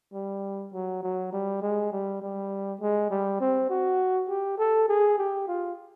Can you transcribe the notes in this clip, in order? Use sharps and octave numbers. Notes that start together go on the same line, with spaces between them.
G3
F#3
F#3
G3
G#3
G3
G3
G#3
G3
C4
F#4
G4
A4
G#4
G4
F4